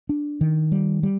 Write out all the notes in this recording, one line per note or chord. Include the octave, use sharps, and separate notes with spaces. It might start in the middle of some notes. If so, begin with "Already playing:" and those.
D4
D#3
G3
G3